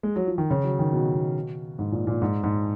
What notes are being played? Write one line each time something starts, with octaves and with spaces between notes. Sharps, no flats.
G#3
F#3
F3
D#3
C#3
F#3
D#3
B2
B2
G#2
A#2
A#2
G#2
G#2